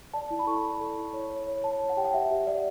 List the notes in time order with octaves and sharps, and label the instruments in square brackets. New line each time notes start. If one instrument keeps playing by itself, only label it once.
[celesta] D5 A5
E4
B5
A4 C#6
B5
D5
A4
E4
C#5
C#5
C#5
C#5 A5
C#5
F#5
G4 G5
F#5
G4 E5
G4 E5
D5 F#5